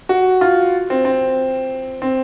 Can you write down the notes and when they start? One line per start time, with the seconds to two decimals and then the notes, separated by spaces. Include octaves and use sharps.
0.09 F#4
0.41 F4
0.90 C4
1.05 C4
2.02 C4